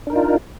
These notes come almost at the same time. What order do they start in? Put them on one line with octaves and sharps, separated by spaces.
D4 A#4 D#4 F4